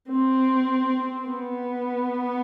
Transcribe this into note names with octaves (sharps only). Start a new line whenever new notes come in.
C4
B3